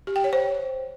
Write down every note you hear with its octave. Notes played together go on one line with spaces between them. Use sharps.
G4
G5
C#5
C5